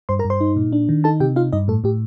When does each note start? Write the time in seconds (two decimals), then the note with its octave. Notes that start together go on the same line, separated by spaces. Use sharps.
0.09 G2 C5 C6
0.19 A#4 A#5
0.25 G2
0.30 C5 C6
0.41 D#4
0.56 A#2
0.72 D4
0.89 D#3
1.04 D#4 A4 A5
1.20 C3 G4 G5
1.36 D#4 F4 F5
1.52 G2 D#4 D#5
1.68 A2 A4
1.84 A2 G4